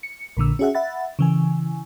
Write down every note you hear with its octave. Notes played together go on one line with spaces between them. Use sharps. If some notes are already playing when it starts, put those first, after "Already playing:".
C#7
A#1 A#2 D3 E6
C#4 F#4 G#4 E5 F#5
E5 F#5 B5 A6
C#3 E3 G#5